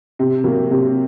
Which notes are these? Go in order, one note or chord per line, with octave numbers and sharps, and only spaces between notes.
C3
F#3 A#3
C3